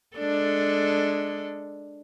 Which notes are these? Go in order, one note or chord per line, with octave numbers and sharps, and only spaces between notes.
G#3 D4 A4